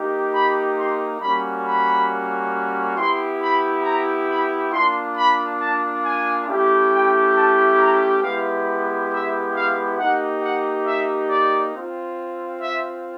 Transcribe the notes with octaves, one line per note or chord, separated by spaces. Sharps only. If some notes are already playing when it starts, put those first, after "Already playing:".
Already playing: A#3 D#4 G4
B5
C6
G3 A#3 C#4 F#4 B5
B5
B3 E4 G4 C6
B5
A#5
B5
A#3 D4 F4 C6
B5
A5
G#5
A3 C#4 E4 G4
G5
A5
A#5
G#3 B3 E4 G4 F5
E5
F5
A#3 D#4 G4 F#5
F#5
E5
D5
C4 F4
E5